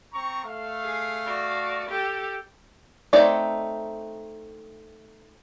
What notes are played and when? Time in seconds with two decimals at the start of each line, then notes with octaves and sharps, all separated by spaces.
0.13 C4 A#5 C#6
0.44 A3 F5
0.84 G#4
1.26 F#4 D5
1.89 G4 A4
3.13 A3 C4 D#4 C#5 D5